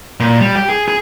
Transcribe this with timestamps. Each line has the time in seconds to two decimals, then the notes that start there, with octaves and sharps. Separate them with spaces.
0.20 A#2
0.41 G3
0.56 G4
0.69 G#4
0.88 G#4